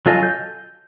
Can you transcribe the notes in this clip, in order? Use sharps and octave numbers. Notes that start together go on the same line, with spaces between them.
F#3 F4 A4 D#5 G#5
G6